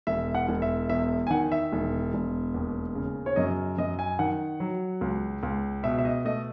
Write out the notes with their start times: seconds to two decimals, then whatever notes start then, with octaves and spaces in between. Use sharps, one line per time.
0.07 E1 E5
0.35 F#5
0.49 E1
0.62 E5
0.89 E2 E5
1.27 G#5
1.30 D#3 F#5
1.52 E5
1.72 E1
2.14 E1
2.54 D#2
2.95 C#3
3.26 C#5
3.36 F#2 D#5
3.78 F#2 D#5
3.99 G#5
4.19 D#3 F#5
4.60 F#3
5.01 C#2
5.43 C#2
5.83 B2 E5
5.98 E5
6.05 D#5
6.25 A3 D#5